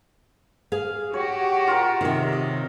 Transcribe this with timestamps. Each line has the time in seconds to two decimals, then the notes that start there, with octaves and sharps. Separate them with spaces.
0.72 G#4 F5
1.13 F#4 G4 C#5
1.68 F4 A#4
2.01 C3 D#3
2.33 D#5